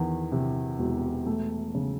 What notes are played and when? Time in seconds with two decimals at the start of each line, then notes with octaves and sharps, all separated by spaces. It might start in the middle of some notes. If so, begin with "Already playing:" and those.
Already playing: E2 D#3
0.32 C3
0.79 E1
1.26 A3
1.75 C#3